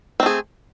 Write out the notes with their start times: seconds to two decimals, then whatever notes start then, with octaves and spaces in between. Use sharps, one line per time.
0.20 C4
0.23 A3
0.26 G#4